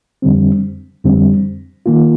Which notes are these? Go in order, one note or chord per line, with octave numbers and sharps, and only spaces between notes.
F2 D3 G3 C4
F2 D3 G3 C4
D#3 A#3 F4